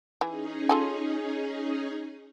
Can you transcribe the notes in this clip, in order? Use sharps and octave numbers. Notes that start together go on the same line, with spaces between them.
E3 C#4 D#4 G#4
F4 A4 G#5